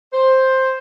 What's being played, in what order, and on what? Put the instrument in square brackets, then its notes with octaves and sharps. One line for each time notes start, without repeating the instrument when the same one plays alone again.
[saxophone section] C5